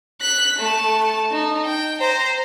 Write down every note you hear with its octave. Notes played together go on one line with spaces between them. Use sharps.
F#6 B6
A3 A5
D#4
G5
C5 A#5